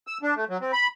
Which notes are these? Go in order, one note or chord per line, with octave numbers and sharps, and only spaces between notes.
E6
D4
A3
F#3
C4
B5